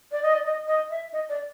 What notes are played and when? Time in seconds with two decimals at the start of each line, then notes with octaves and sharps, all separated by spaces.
0.11 D5
0.22 D#5
0.34 D5
0.45 D#5
0.67 D#5
0.90 E5
1.13 D#5
1.29 D5